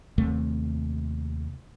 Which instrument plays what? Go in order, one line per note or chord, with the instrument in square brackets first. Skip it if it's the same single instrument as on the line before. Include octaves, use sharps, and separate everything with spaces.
[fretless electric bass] D#2 C3 A3